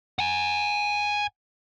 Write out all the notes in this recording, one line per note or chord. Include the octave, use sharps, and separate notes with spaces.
F#5 G#5